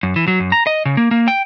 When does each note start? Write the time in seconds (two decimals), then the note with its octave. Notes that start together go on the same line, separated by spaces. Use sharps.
0.03 F#2
0.16 E3
0.28 F#3
0.40 F#2
0.52 A#5
0.67 D#5
0.85 C#3
0.97 A#3
1.11 A#3
1.28 G5